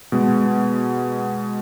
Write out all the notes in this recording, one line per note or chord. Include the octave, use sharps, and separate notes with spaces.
B2 G#3 B3